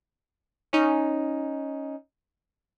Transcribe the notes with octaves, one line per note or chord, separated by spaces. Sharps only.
C#4 D#4